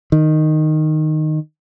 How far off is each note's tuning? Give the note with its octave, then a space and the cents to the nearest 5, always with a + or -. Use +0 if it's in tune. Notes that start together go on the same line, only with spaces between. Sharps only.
D#3 -10